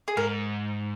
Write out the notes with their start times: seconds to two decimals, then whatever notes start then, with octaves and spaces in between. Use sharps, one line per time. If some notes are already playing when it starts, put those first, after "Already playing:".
0.08 G#4
0.17 G#2 A#4